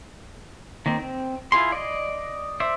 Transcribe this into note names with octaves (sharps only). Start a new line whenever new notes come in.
D#3 A#3 C4
C4
E4 F4 G#4 C6
D5 D#5
C5 D5 E5